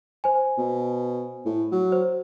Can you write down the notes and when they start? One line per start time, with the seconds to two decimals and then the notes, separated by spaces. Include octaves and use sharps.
0.24 C5 G#5
0.58 B2
1.46 A2
1.72 F#3
1.92 C5